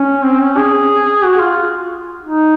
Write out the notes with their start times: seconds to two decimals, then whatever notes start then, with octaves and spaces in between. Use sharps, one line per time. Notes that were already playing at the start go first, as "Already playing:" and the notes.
Already playing: C#4
0.24 C4
0.41 C#4
0.58 G#4
1.24 F#4
1.40 F4
2.24 D#4